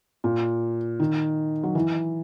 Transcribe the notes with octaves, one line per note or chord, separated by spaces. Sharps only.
A#2
D#3
F#3
E3